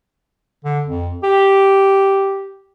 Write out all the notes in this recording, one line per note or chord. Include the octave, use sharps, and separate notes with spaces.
D3
F2
G4